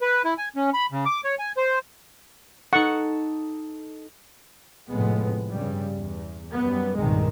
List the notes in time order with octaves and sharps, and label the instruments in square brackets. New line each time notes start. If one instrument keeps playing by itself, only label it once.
[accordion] B4
E4
G#5
C#4
B5
C#3
D6
C#5
G#5
C5
[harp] D#4 A4 [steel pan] F#5 C#6
[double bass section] F1 F2 A2 G#3 B3
G2 C#3 G3
E2
F#2 G3 B3
C2 G2 A#2 D#3 G#3